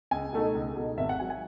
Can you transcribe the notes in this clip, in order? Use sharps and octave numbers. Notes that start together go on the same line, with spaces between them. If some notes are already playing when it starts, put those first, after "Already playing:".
C#2 G#5
B2 A3 D#4
C#2
B2 A3 D#4
G#1 E5
F#5
G#2 F#3 G#5
G#5